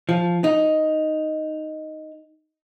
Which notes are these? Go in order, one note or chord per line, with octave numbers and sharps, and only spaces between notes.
F3
D#4